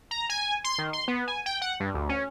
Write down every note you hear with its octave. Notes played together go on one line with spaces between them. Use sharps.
A#5
G#5
C6
D#3
C6
B3
G#5
G5
F#5
G2
D2
C#4